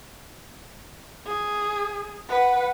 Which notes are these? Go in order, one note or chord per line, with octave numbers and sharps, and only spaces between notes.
G#4
B4 F#5